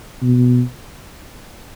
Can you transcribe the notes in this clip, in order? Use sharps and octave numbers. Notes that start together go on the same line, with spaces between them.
B2